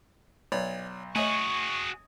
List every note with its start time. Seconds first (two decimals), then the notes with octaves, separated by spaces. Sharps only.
0.52 B1 C#5 D5
1.16 A3 F#4 G#4 C#5 D#5 G#5 C#6